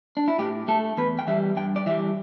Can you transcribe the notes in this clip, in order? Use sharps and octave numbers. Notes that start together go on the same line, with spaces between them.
D4
E4
A2 G4
A3 A4
E2 B4
G5
E3 G3 E5
G2 G5
D5
E3 G3 E5